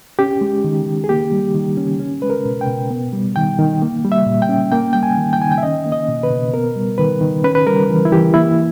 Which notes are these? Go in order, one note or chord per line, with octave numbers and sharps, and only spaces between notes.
C#4 G4
G#3
D#3
D#3
G#4
A#3 G4
G3
D#3
C#4
C#4
G#3 B4
A#4
B2
G5
B2
B3
G3
D#3 G5
D#3
A#3
G3
E5
A#2
G5
C#4
A#3 G5
G3 G5
G#5
D#3
G5
D#3 G#5
G5
E5
C#4 D#5
A#3
D#5
B2
B4
B2
B3 A#4
G3
D#3 B4
D#3
C#4 B4
B4
G3 A#4
E3
E4
E3 G4
A#3 E4